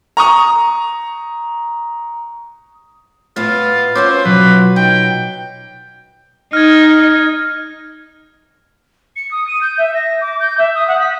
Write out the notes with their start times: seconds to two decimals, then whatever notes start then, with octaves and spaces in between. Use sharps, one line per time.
0.17 A#5 C#6 D#6
3.36 A2 B3 E4 F4
3.95 C#4 F4 F#4 C5 D6 E6
4.25 B2 F#3 B4
4.76 D#4 G5
6.53 D#4 F6 G#6
9.15 C#7
9.31 D#6
9.47 D#7
9.61 G6
9.77 E5
9.94 A#6
10.21 D6
10.39 G6
10.57 E5
10.74 D#6
10.87 F#5
10.99 B6